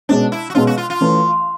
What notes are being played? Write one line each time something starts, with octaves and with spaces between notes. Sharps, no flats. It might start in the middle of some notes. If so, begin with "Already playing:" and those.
B2 G#3 C#4 D4
E4
F#4
B2 G#3 C#4 F4
F#4
F4
F4
E3 A3 C#4